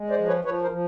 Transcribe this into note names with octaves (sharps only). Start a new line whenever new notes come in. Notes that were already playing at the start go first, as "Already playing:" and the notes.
Already playing: G#3
C5 D5
F3
B4 C#5
F3 B4 C#5
A#4 C5
F3